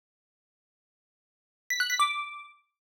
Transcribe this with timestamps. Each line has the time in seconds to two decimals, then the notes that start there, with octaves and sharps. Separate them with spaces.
1.70 B6
1.80 F#6
1.90 B6
1.99 D6